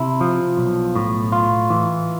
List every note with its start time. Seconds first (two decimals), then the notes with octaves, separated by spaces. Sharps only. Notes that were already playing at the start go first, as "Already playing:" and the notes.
Already playing: C3 E4
0.21 F3
0.57 B1
0.95 A2
1.32 F4
1.70 E3